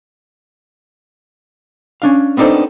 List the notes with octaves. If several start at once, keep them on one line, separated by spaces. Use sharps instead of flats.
C#4 D4 F5
B3 C4 D4 D#4 A4 C5